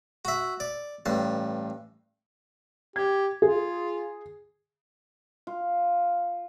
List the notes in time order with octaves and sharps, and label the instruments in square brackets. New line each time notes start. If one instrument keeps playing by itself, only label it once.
[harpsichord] F#4 E5
D5
A1 G2 A5
[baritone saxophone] G4 [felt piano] G#6
[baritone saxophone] F4 [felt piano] G#4
[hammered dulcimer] F4